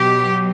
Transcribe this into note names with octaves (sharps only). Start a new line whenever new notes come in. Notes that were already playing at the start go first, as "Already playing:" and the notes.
Already playing: B2 F#3 G4